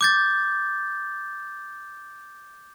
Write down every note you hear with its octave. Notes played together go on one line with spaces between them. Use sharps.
D6 G6 A6